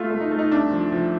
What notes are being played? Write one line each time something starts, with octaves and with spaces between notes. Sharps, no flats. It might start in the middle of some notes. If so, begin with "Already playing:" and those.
Already playing: A3 F4
A3
D#4
A3
D#4
C2 D4
F3
F3